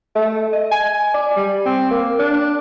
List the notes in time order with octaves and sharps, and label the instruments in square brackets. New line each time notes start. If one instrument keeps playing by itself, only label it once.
[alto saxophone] A3
D#5
G#5
D5
G3
C4
A#3
D4